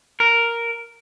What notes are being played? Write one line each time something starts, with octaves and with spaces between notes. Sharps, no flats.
A#4